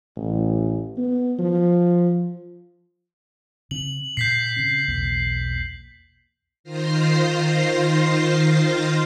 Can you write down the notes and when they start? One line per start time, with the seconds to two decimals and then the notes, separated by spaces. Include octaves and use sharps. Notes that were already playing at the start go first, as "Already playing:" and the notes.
0.16 A1
0.97 B3
1.39 F3
3.71 C#3 C4 F#7
4.17 A#2 G6 B6 C7
4.57 C#3 C4 C#4
4.88 B1 E2 A#3
6.64 D#3 F4 C5 F5 A#6 C7